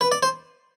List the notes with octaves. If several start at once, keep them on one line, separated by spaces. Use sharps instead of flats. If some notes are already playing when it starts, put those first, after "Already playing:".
B4
D5
C5